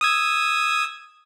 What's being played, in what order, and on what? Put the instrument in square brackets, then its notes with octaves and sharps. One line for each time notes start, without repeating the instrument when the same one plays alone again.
[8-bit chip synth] D#6 E6 G#6